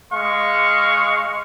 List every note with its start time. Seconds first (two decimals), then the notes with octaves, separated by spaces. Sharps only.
0.13 G#3 F5 C#6